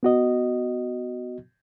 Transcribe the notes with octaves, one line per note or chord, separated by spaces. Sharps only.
B3 F#4 D#5